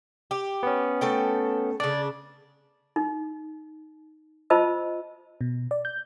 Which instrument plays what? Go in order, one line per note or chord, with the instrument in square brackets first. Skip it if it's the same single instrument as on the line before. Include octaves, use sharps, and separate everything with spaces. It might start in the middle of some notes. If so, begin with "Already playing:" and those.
[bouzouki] G4
[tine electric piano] B3 C#4
[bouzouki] A3 A4 G5
[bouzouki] C#3 D4 [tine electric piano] D5
[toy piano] D#4
F4 C5 D#5 A5 E6
[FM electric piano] B2
D5
G6